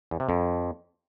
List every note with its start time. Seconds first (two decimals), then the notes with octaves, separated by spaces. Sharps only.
0.11 E2
0.20 C3
0.29 F2